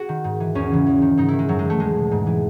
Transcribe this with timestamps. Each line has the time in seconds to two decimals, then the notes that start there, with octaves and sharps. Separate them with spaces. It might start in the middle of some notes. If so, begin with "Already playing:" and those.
Already playing: F#4 G#4
0.09 D#3
0.24 G#2
0.40 E3
0.55 E2 C#4
0.71 C#3 E3
0.86 E2
1.02 D#3
1.17 G#2 D#4
1.28 D#3 E4
1.39 G#3
1.48 F#2 F#3
1.59 G#3
1.65 E3 A3
1.80 E2 G#3
1.96 B2
2.11 G#2
2.27 E3